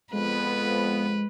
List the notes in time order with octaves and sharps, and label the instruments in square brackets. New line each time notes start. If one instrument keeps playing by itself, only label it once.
[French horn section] F2 F3 [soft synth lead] G#3 [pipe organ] B3 [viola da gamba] B4